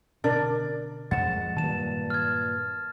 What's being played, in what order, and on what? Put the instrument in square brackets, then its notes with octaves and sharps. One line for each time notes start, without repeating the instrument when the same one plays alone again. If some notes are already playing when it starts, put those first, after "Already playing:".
[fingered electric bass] B2 D3 [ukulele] D4 A#4 D5
[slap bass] F2 G#3 [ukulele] F#5 [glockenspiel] A6 E7
[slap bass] G2 A#2 [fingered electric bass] D#3 F#3 G3 [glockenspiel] A5 E7
[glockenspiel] F6 G#6